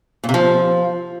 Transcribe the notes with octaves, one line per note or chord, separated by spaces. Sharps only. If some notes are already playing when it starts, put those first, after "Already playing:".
A#2
C3
F3